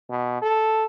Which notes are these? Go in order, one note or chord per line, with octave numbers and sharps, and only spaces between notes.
B2
A4